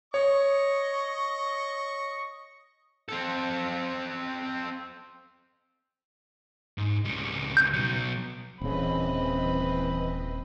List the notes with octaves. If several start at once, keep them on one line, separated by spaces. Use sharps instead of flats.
C#5 D#5 C#6
C4 A4
G#2
C#2 G3
G6
B2 F#3
D#1 C#3 E3 C4 B4 D#5 B5